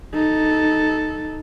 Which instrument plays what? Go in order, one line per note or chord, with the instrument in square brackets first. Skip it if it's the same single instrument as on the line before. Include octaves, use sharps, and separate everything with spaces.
[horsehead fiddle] D#4 A4